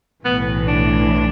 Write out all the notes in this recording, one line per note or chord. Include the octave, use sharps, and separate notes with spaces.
B1 A2 E3 B3
D4